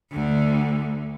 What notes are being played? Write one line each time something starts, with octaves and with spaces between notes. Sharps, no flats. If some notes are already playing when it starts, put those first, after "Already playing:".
D2 D3